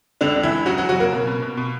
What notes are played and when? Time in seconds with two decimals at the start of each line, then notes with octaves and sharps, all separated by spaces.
0.21 C#2 D3 D4
0.36 C#2
0.43 E3 E4
0.51 C#2
0.66 C#3 F#3 F#4
0.78 F#3 F#4
0.81 E3
0.89 F#3 F#4
0.96 C#3 A#3 A#4
1.13 B2
1.27 B2
1.42 B2
1.57 B2